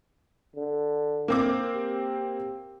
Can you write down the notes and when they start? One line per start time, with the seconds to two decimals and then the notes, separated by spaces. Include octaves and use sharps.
0.56 D3
1.28 A#3 C4 D6
1.74 G4